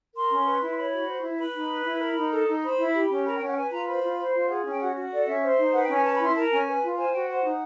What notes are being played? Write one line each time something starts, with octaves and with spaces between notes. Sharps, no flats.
A#4 C6
C#4
B4
E4
C6
C#5 B5
F#4
C5
E4
B4 B5
D#4
B4
E4
A#4
D#4
A4
D#4
C5 B5
E4
G4
C#4
A#4 B5
G5
C#4
F#5
G5
B4 G#5
F4 A#5
C5 B5
F4
C5
F4
G#4 F#5
C#4
G5
F#4 F#5
F#4
A4 D5
C#4 E5
C5
D#4
B4 F#5
G5
C#4 G#5
B4 A5
B5
E4
C6
A#4 A5
C#4 G#5
B4
F4
C5 G#5
F#4 G5
C5 F#5
D#4